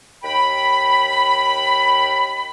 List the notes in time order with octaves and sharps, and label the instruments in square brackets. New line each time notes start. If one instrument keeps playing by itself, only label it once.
[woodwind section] D#2 G5 B5